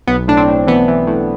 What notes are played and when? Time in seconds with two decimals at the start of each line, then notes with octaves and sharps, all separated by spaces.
0.07 B1 B3
0.28 A2 D4
0.37 C4
0.48 A2
0.67 E3 B3
0.88 E3
1.07 A2